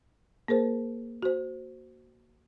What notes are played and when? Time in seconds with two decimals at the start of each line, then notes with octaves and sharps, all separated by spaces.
0.48 A#3 G#4 A#4 C5
1.23 F#4 C5